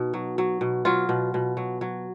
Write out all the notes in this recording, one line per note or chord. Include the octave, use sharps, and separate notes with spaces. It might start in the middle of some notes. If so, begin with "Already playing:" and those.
Already playing: B2 D#4
F#3
F#3
B2
F#3 F4
B2
B2
F#3
F#3